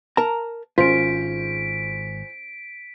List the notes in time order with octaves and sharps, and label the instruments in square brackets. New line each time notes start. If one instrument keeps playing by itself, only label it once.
[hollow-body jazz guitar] A#4 A5 A#5
[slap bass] G#1 [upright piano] C#4 C5 [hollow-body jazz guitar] F4 [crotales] B6 D7